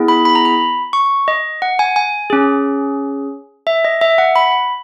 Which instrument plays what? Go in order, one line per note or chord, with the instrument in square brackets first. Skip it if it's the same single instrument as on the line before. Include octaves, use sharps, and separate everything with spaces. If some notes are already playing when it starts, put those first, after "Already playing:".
Already playing: [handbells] B3 E4 G#4
B5
B5
A#5
B5
C#6
D#5
F#5
G#5
G#5
C#4 G#4
E5
D#5
E5
F#5
B5